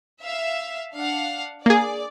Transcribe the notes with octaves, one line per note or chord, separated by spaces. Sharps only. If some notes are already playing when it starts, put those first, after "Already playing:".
E5 F5
D4 F5 F#5
A#3 G#4 D5